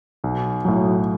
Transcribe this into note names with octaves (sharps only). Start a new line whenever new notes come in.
B1
A2 F#3